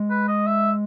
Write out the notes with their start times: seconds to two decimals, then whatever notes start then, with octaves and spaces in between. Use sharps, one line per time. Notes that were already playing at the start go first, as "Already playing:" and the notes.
Already playing: G#3
0.10 B4
0.28 D#5
0.46 E5